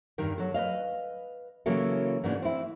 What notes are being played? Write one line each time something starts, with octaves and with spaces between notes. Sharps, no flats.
E2 G2 D#3 A#4
F#3 A4
B4 C#5 D#5 F5
C#3 E3 F#3 A#3 E4 A4
G#2 C#3 E3 A#3 B3 D4
C4 E4